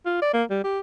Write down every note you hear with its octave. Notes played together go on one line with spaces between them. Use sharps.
F4
D5
A#3
G3
G4